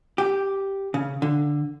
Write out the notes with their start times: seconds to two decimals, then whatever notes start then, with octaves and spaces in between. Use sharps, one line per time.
0.18 G4
0.94 C#3
1.22 D3